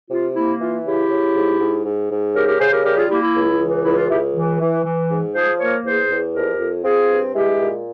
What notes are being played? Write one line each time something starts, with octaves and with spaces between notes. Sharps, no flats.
C3 F4
A#3 E4
E3 F4
C#3 E4 G4
C#3
G#2
G#2
G#2
G#2
C#3 G4 A#4
G4 A#4
C#3 G#4 C5
G4 A#4
G3 G4 A#4
F4 G#4
A#3 E4 G4
E4
C#2
E3
C#2 E4
F4
C#2 E4 G4
E3
E3
E3
G#2
F3 G#4 C5
A#3 A#4 C#5
E2 G#4 C5
E2
F2 G4 A#4
F2
C4 F4 G#4
G2
G#3 E4 G4
A#2